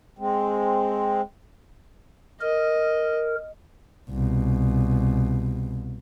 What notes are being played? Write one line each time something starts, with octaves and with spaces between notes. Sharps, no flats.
G#3 C4
A#4 D#5
C2 B2